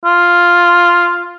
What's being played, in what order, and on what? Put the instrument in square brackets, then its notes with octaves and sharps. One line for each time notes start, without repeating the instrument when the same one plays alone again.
[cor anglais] F4